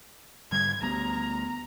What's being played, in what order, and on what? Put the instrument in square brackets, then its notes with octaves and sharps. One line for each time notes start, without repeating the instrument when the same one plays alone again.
[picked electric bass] G#2 D3 G3 [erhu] G#6
[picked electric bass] D2 G3 B3 [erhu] A#5